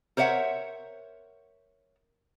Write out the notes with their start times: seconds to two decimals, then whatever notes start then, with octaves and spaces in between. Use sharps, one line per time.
0.17 A#4 C5 C#5 E5 F#5